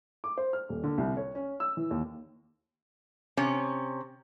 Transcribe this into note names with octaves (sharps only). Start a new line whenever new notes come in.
D6
C5
F6
D#1
D3
C2
C#5
C#4
E6
E3
D#2
C3 C#4